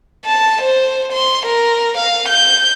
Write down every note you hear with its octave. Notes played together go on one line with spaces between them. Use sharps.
A5
C5
C6
A#4
F5
G6